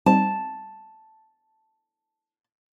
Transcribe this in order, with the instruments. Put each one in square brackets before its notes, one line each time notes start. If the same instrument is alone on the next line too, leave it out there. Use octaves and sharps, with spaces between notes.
[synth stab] G3 C4 D#4 [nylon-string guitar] A5